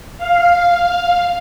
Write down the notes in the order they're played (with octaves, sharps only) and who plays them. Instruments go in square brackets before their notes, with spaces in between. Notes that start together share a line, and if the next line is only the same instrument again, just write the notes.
[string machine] F5